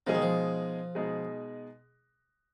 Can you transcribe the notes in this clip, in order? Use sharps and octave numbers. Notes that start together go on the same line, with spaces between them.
B2 F3 G#3 D#4 G#4
D#3
F3
B2 G#3 D#4 G#4